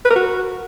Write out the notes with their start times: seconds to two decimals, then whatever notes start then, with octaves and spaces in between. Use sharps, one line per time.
0.05 B4
0.10 A#4
0.16 F#4